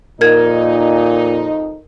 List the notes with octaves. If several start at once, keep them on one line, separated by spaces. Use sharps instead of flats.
F2 A#2 D#4 A#4 G#6